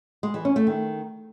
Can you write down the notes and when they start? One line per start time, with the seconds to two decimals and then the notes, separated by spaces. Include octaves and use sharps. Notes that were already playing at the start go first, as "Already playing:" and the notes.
0.23 G#3
0.34 E3
0.45 C#4
0.56 A3
0.67 D#3